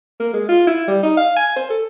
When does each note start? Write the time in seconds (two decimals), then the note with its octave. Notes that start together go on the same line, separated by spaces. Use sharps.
0.20 A#3
0.33 G#3
0.49 F4
0.67 E4
0.88 G3
1.03 D#4
1.17 F5
1.36 G#5
1.56 C5
1.70 A4